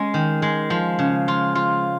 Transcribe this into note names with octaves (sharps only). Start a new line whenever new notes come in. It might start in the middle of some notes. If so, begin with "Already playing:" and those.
Already playing: G#3 C#4
D#3
G#3
F3
C#3
F4
F4